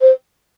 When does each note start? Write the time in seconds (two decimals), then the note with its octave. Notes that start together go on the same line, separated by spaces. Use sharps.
0.01 C5